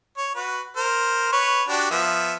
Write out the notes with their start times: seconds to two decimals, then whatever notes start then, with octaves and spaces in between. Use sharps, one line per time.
0.18 C#5
0.35 F#4 B4
0.77 A#4 C5
1.32 B4 C#5
1.69 D4 F#4 G4
1.91 F3 B3 E5